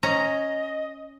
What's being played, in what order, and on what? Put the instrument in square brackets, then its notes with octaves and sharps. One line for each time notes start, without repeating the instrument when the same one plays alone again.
[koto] C#4 A#5 [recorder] D#5